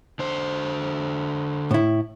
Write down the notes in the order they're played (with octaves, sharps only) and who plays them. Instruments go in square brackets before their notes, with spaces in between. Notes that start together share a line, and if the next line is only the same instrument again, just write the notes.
[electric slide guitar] D3 C5
[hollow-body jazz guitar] A2 E4